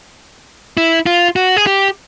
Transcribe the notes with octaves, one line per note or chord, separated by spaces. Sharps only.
E4
F4
F#4
G#4
G4